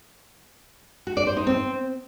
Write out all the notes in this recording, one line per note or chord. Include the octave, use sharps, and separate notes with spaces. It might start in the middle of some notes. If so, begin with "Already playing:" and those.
F#4
D5
C5
D#4
C4